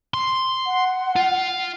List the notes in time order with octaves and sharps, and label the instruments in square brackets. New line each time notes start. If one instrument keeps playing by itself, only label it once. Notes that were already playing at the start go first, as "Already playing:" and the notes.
[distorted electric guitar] C6
[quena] F#5
[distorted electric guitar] F4